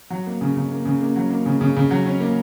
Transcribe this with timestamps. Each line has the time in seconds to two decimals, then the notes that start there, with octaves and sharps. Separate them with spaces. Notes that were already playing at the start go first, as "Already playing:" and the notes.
0.10 F#3
0.27 A#3
0.41 C#3
0.56 C#3
0.71 A#3
0.85 C#3
1.01 A#3
1.16 F#3
1.31 A#3
1.46 C#3
1.61 C#3
1.76 C#3
1.91 F#3
2.06 C#4
2.20 A#3